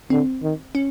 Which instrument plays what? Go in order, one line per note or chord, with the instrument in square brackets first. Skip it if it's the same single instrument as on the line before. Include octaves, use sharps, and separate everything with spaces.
[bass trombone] D3 [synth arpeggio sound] C4
[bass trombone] D#3
[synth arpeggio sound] C#4